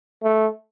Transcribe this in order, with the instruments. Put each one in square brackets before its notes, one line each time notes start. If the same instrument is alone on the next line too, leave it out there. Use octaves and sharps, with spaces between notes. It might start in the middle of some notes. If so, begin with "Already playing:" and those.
[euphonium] A3